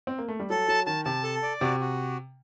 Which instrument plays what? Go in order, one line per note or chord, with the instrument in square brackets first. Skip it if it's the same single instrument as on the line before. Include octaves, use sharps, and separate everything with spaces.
[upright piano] C4
A#3
A3
G3
[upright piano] F#3 [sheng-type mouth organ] A4
[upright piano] F#3 [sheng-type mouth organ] A5
[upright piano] D#3 [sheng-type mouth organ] A5
[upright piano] C3 [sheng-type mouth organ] A5
[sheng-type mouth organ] A4
D5
[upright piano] C3 [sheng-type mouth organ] F#4
[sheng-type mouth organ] F#4